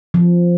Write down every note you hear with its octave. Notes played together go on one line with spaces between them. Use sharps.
F3